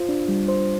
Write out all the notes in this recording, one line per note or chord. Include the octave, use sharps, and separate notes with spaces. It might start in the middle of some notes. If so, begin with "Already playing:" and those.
Already playing: F4 C5
D4
G3
C5